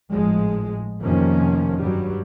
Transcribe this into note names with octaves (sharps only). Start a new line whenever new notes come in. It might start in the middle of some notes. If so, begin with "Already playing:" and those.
G#1 A2 F3 G#3
F1 C3 D#3 F3 A#3 C#4
G2 F#3 G3